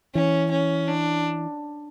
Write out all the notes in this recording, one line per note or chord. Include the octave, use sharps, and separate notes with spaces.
E3 C#4
C#4
D4